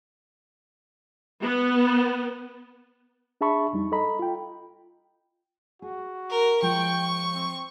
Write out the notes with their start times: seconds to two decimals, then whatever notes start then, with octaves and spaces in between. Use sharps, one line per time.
1.41 B3
3.41 D4 G#4 E5 A5 B5 C#6
3.73 F2 G3 D#4
3.92 A4 D#5 A#5 B5
4.19 F4 G5
5.82 F#4 G#4
6.31 A#4
6.62 F3 G#3 G5 C#6
7.34 C4